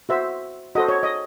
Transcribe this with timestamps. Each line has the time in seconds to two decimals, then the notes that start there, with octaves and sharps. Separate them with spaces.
0.09 F#4 C5 E5
0.75 F#4 A4 C5 D#5
0.89 C#5
1.03 D#5